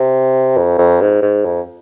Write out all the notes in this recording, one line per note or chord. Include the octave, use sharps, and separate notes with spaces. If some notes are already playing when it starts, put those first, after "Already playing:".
Already playing: C3
F2
F2
G#2
G#2
F2